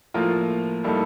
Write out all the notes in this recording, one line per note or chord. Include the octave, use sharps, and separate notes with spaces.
A2 F3 A#3 F4 A#4
A2 G3 A#3 D#4 A4